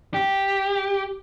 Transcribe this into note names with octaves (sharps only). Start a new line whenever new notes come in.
G4